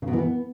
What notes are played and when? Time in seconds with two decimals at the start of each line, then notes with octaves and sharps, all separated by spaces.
0.02 C#3
0.08 B2
0.13 E3
0.18 B3